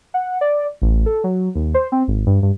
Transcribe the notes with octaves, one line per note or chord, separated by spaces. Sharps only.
F#5
D5
A1
A4
F#3
D#2
C5
C4
G#1
G2
G2